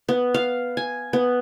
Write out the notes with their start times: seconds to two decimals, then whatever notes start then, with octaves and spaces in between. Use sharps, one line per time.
0.09 B3
0.34 F5
0.77 G#5
1.13 B3